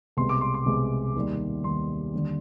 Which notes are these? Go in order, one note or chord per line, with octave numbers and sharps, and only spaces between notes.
C2 B2 G#3 C6
D6
C6
C6
C2 B2 G#3
D#2 D#3 G3
D#2 D#3 G3 C6
D#2 D3 G3